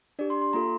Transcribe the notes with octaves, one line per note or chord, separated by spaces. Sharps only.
D4 G4 D5
C6
C6
A#3 F4 A4 A#5